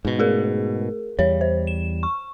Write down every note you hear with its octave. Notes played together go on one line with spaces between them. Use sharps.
G#2 B2
A3 G#4 A#4
E2 G3 C#5
C5
E7
C#6